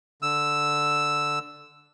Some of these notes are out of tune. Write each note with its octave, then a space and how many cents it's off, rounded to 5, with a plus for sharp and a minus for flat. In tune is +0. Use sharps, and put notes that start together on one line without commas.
D3 +0 E6 +0